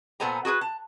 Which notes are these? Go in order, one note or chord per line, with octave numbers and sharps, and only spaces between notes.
A#2 B3 A4 C5 G#5 A#5
F#4 G#4 A#4 B4
A5